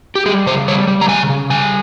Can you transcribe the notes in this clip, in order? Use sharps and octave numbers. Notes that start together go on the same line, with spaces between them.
G4
G3 G#4
C#3 C5
G3 C#5
G3
A#5
C#3 G#5
C#3
G3 G#5